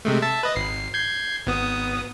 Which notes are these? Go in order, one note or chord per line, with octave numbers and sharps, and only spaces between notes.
C3 G#3 A3
E5 A5 A6
B4 D#5
G#1 C7
G6 G#6 C7
G#1 B3 D#6